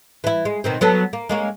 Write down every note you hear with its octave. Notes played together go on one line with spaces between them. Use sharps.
E3 E4
G#3
B2 D#3 C4
F#3 B3 A4
A#3
G#3 A#3 C#4